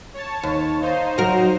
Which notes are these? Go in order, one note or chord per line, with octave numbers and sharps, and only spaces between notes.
C#5 A5
D#2
D#4 C5 F5
F#3 F#4 A#4